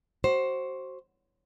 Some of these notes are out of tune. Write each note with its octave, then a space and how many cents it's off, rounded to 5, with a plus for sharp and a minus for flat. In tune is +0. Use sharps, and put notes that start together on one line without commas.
F#4 +25 C5 +15